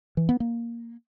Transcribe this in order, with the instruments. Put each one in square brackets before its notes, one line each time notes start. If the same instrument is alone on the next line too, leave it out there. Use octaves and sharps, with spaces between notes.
[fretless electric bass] E3
B3
A#3